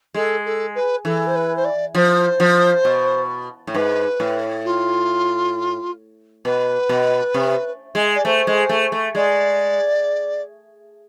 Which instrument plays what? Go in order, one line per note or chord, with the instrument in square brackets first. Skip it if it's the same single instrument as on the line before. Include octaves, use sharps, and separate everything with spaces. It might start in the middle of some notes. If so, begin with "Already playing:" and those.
[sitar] G#3 [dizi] A4
[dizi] A4
B4
[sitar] E3 [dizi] A4
[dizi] C5
B4
C5
D5
[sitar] F3 [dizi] C5
[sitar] F3
B2
A2
[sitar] G#2 [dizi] B4
[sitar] A2
[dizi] F4
[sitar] B2 [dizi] B4
[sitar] B2
C3
G#3
[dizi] D5
[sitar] A3 [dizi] C5
[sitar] G#3
A3
A3
[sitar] G#3 [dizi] D5